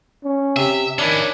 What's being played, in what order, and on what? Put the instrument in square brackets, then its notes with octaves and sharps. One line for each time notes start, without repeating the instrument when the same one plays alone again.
[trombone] C#4
[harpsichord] C3 [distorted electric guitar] E5
[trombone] D#3 [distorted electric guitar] C#4 E4 [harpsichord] D4